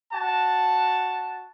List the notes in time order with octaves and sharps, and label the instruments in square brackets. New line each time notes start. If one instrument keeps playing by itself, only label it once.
[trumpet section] F#4 A5